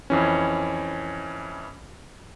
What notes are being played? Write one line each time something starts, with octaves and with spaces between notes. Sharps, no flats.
F2 E3 C#4